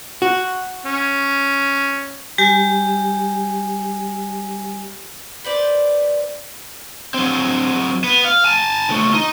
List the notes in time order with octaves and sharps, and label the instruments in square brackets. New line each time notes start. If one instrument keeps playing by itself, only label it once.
[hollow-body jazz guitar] F#4
[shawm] C#4
[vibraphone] G3 G4 G#5
[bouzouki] B4 C5 D5
[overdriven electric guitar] F#3 C4
B3
F5
G#5 A5
C#2 A3
D#4